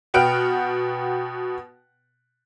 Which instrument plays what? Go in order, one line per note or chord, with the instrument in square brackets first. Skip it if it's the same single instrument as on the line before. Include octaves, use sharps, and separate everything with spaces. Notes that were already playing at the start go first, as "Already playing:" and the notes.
[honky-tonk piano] B2 B4 F#5 G5 F6 D7